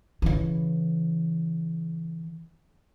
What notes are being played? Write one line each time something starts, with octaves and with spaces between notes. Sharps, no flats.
C#3 E3